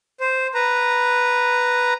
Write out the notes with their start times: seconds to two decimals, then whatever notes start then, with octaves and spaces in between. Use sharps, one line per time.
0.20 C5
0.54 B4 A#5